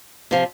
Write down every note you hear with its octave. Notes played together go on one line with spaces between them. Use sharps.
C3 F3